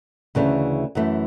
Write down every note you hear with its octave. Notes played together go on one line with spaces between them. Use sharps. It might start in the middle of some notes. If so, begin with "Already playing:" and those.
D2 C#3 E3 A3
F#2 E3 A3